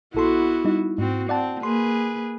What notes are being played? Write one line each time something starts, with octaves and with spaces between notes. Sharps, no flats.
A#1 B3 E4 F#4 A4 C6
G3 D#4
G#2 C4 F#4
C4 D5 F#5 A5
A#3 G#4 B4 C6